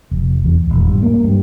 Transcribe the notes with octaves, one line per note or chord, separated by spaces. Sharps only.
F1
E2
D#1
G2
A#3
G2